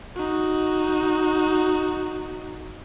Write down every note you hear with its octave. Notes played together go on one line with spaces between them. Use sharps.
D#4 F#4